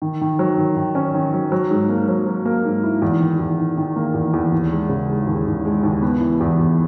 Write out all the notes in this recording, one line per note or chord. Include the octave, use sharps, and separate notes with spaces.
D#3
D#3
F#3
D#3
D#3
C#4
D#3
F#3
F#3
G#2
A#3
F#3
F#3
A#3
G#2
E4
E2
D#3
E2
D#3
D#3
A#3
E2
E2
D#2
G#3
C#3
G#3
D#2
D#2
G#3
D#2
B3
E3
E2
E2